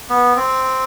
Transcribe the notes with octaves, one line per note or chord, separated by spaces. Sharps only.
B3
C4